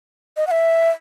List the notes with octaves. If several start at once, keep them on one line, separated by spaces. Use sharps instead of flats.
D#5
F#5
E5